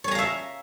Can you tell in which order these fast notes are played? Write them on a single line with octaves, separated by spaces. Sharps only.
C#5 G#5 A#5 F5 E5